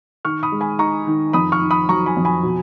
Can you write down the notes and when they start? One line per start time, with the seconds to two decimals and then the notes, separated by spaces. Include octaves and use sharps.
0.25 D#3 C#6 F6
0.43 B5 D#6
0.52 G#3
0.61 G#5 B5
0.79 D#4 A#5 C#6
1.07 D#3
1.33 F2 B5 D#6
1.52 C#6 F6
1.62 D#3
1.71 B5 D#6
1.88 F#3 A#5 C#6
2.06 G#5 B5
2.17 F2
2.25 G#5 B5
2.43 B2